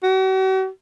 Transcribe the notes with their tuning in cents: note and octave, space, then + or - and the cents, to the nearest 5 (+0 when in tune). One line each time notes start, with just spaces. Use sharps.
F#4 +45